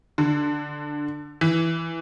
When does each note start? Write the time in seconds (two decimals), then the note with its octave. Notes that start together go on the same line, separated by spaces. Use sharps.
0.18 D3
1.41 E3